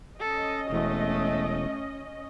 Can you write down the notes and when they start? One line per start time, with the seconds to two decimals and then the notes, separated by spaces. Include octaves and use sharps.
0.20 C#4 A4 D#5
0.70 E1 A3